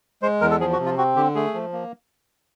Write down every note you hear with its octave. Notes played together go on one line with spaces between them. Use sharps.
G#3 C5
E2 A#4
A4
F3 G#4
F#4
C3
F4
C4 F#4
D3 G4
A3 G#4
F3
A#3